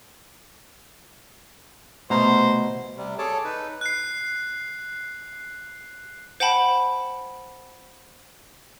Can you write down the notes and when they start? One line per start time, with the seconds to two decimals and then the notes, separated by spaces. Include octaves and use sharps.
2.10 C2 B2 A3 C5 A#5
2.97 C3 G3
3.19 G#4 A4 C#5 A5 D6
3.44 D#4 B4
3.81 F#6 C7
6.40 C5 F#5 G5 A5 B5